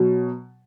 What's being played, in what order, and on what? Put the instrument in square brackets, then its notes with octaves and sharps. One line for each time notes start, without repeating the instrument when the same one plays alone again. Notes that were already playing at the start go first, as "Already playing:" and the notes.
Already playing: [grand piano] B2 F#3